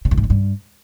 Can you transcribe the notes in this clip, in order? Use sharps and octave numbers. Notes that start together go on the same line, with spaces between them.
C#3
F#2
G#2
D3
G2